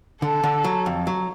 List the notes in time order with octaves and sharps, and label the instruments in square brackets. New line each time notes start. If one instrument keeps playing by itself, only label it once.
[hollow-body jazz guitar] D3 [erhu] A4
[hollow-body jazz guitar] D3
F#3
F2
F#3